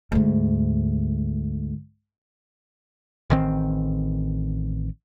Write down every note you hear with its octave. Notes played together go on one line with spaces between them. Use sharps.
D2 G#2
A1 D#3 C4